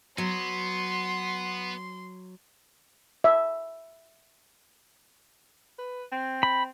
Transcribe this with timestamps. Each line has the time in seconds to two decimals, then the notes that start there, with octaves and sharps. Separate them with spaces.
0.18 F#3 B3 C6
3.24 E5
5.79 B4
6.12 C4
6.43 B5